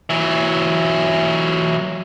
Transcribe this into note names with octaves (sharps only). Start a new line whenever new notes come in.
E3 F#3